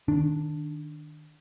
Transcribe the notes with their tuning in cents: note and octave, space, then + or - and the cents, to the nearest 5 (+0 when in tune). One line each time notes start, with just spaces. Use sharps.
D#3 -20 D4 +0